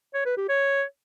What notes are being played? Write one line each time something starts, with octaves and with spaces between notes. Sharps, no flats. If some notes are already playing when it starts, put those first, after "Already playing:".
C#5
B4
G4
C#5